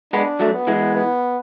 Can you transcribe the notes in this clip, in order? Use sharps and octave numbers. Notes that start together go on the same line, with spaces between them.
G#3 B3 D4
F#3 A3
B3
E3 G#3
B3